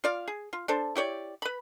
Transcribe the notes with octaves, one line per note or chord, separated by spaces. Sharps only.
F4 D5 F5
G#4
F4
D4 A4 C5
E4 G4 C#5 D5
B4 B5